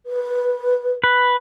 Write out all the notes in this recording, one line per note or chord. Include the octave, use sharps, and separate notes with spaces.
B4
B4